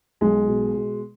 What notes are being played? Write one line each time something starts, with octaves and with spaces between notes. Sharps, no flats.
B1 G#3
B2
B2